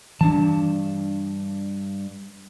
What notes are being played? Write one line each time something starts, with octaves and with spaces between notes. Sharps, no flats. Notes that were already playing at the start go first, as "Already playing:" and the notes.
G2 E3 C4 D4 A5